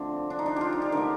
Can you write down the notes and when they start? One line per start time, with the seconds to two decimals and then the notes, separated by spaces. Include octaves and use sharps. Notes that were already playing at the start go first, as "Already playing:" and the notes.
Already playing: D3 F3 A3 C4 D4
0.30 D4
0.39 D#4
0.46 D4
0.56 F4 G4
0.72 D#4
0.82 G4
0.92 D3 A3 A#4